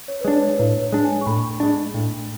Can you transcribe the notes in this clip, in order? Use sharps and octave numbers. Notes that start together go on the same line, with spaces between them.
C#5
B4
G#3 D4 C#5
B4
C#5
A2 B4
C#5
G#3 D4
G#5
C#6
A2 B5
G#3 D4
A2